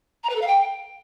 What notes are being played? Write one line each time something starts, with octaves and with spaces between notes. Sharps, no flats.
A#5
B4
A4
F5
G5